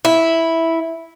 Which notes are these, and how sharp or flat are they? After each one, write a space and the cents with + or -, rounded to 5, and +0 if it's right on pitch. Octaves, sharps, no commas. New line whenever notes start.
E4 -5